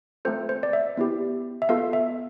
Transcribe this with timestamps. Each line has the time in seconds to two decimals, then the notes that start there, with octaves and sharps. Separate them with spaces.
0.25 A3 C4 F4 A4 C5
0.49 C5
0.63 D5
0.73 E5
0.97 B3 E4 G4
1.62 E5
1.69 B3 F4 A4 F5
1.93 E5